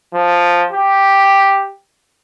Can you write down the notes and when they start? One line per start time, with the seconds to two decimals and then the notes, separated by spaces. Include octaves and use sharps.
0.14 F3
0.72 G4